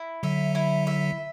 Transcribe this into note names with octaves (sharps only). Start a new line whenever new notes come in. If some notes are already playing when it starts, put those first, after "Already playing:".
Already playing: E4
D3 F#3 E5
E4
E5